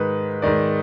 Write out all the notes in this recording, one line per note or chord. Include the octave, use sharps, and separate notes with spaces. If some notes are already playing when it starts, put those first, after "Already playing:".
Already playing: G#2 D#3 B4
G#2 D#3 D5